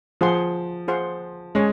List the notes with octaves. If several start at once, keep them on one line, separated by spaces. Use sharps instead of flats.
F3 F4 G#4 C5 F#5 C6
F4 G#4 C5 F#5 C6
G#3 C#4 G#4 C#5 G#5 C#6